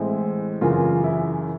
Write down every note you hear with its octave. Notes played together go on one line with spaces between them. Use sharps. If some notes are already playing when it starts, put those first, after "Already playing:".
Already playing: A2 E3 G#3 C4 E4
F#2 C#3 E3 F4
E4